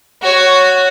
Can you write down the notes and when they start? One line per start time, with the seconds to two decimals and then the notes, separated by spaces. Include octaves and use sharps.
0.22 F#4 C#5